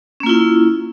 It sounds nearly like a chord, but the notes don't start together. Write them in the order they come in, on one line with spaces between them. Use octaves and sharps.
C#4 A#3 F4 E4